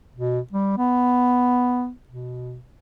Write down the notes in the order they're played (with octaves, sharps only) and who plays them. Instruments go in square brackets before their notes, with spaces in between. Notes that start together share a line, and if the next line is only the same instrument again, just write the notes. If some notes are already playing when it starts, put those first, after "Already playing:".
[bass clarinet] B2
G3
B3
B2